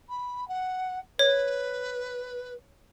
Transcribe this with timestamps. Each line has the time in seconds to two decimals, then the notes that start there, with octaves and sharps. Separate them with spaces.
0.09 B5
0.48 F#5
1.19 B4 C#5